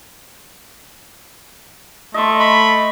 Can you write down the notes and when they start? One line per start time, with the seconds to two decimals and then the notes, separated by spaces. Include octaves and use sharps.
2.14 A3 D#5 C6
2.40 B5